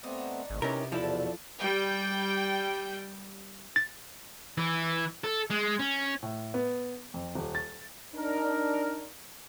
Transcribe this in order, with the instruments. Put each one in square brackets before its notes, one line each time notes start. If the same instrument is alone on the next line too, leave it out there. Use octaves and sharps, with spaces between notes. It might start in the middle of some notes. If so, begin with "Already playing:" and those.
[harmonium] A3 B3 C4 [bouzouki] D4 D#4
[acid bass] G#1 [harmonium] A2 C3
[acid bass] C3 [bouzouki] B3 G4 [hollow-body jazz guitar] C#4 D#4 A#4 [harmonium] E4
[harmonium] E2 B2 [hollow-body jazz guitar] F3 E4 A4 [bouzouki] F#3 D4 D5
[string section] G3 G5
[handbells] A6
[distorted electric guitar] E3
A4
G#3
C#4
[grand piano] A2
B3
F2
D#1
A6
[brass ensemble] D4 D#4 A#4